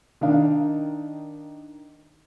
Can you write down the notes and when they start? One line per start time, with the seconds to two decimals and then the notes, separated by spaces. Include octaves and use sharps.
0.21 D#3 D4 F5